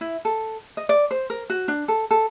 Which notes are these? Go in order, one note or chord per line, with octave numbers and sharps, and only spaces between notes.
E4
A4
D#5
D5
C5
A#4
F#4
D4
A4
A4